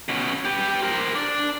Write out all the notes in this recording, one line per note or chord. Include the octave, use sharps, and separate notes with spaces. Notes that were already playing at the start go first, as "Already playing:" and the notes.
B2 C#4
G4 B4
A#4 C5
D4 D5